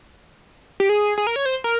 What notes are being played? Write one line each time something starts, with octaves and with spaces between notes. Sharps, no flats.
G4
G#4
G#4
A#4
C#5
C5
A#4